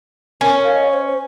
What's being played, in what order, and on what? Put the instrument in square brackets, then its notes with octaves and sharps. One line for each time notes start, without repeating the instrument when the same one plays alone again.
[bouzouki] C#4 [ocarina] A#4
[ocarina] F5
D#5
C#5
C5
C5